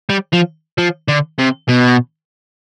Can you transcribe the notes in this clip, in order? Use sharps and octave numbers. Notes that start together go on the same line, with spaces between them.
G3
F3
F3
D3
C3
B2